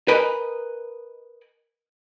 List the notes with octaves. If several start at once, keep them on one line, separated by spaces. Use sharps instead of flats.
A#4 B4 D#5 G#5 A#5